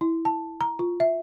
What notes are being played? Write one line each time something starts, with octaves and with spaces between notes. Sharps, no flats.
E4
A5
A#5
F4
E5